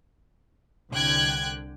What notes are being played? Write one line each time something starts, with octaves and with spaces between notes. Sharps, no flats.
C2 D3 G5 F#6 G#6